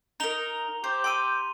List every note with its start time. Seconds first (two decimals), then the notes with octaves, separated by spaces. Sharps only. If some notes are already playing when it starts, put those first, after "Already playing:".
0.20 D#4 A#4 A#5 F7 G7
0.84 G4 C5
1.04 G5 C6 E6 D#7